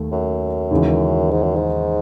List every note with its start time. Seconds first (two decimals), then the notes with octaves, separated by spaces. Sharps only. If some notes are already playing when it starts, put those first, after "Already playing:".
Already playing: D#2 D#3 A3
0.12 F#2
0.71 D#2 C#3 E3 G#3
1.31 G#2
1.43 F#2
1.56 G#2